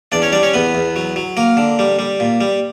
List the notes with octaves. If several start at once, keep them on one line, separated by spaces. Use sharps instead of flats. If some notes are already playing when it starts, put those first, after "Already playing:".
E2 D4 D5
C#4 C#5
G3 D4 D5
C#4 C#5
E2 B3 B4
E2
F#3
F#3
A#3 A#4
D3
G3
G3
A#2
G3